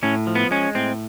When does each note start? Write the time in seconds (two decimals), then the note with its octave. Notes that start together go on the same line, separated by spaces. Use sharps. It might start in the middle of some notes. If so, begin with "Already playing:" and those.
0.03 A2 C#4
0.27 F3
0.35 B3
0.51 G#3 C#4
0.75 A2 C4